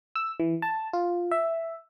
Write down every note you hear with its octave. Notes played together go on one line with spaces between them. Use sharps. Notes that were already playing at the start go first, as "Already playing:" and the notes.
E6
E3
A5
F4
E5